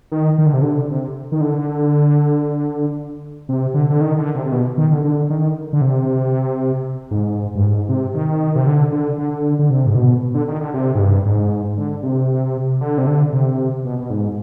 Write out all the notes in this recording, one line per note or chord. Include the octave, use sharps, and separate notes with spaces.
D#3
D#3
D3
C3
D3
C3
D#3
D3
C3
D3
D3
D#3
D3
C3
C3
B2
D#3
D3
D3
D#3
D3
C3
G#2
G2
G#2
C3
D#3
C3
D3
D3
D3
D3
C3
G#2
B2
D3
D#3
D3
C3
G#2
G2
G#2
D3
C3
D3
C3
D3
C3
B2
B2
G#2